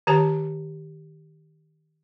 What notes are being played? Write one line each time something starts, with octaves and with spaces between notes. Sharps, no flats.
D#3 G4 C#5 A5